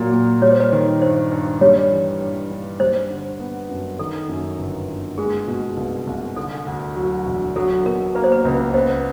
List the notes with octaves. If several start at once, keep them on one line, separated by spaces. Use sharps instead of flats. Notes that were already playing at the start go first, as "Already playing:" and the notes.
Already playing: A#2 F#3 A#3
A#2
G3 C#5
C5
B4
D#3 C5
G2 C5
G2
G3 C#5
E3
G2
G2
G3 C5
D3
B3
F#2
D#3 A4
F#2
G1
G1
G#3 G#4
B2
C2
C2
D3 A4
D2
F#3
E1
F#3 A4
B2 A#4
A#3 B4
C5
B4
C#2
B3 C5